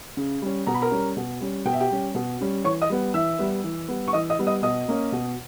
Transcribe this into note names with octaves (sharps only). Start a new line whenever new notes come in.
C#3
G3 C#4
B2 A#5
B5
A#4 A#5
G3 C#4
B2
G3 C#4
B2 G5
E5
G4 G5
G3 C#4
B2
G3 C#4
E3 C#5 C#6
D#5 D#6
G3 B3
E3 E5 E6
G3 B3
E3
G3 B3
C#6
E3 D#5 D#6
D#5 D#6
G3 B3
D#5 D#6
B2 D#5 D#6
A#3 C#4
B2